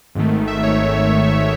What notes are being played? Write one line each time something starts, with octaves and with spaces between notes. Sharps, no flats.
G#1 G#2 D#3 A3
E5
C#5